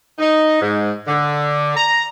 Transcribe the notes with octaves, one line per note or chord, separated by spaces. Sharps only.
D#4
G#2
D3
A#5